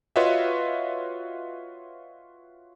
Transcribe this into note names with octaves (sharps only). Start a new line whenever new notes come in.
F4 F#4 B4 C#5 D#5 E5